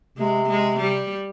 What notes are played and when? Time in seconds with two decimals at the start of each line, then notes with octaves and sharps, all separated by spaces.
0.18 C3 G#3
0.50 G#3
0.80 G3